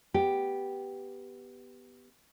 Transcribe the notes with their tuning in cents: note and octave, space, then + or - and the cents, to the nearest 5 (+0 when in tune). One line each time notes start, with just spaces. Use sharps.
B3 +0 G4 +0